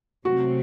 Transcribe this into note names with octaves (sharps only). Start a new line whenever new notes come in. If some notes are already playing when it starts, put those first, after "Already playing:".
C3 F#3 A3 C4 F#4